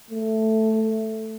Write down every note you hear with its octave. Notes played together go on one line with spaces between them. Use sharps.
A3